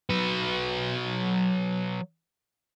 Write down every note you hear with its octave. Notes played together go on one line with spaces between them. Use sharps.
F#3 B4